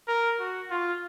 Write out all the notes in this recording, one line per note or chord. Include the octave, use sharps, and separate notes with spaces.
A#4
F#4
F4